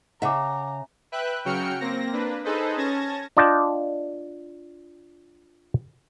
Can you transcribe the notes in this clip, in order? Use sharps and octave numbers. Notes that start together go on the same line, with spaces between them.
C#3 E5 F#5 A#5 D6
B4 E5 G5 F#6
C#3 F#3 F#4 G5 F6 C#7
A#3 C4 A#6
A#3 D4 B4
D#4 G#4 A4 B4 C5 D#5
C#4 A5 G#6 A#6
D4 F4 D5 D#5 G5 A5